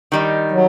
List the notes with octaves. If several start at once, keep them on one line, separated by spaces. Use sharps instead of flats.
D#3 G3 D#4
F#3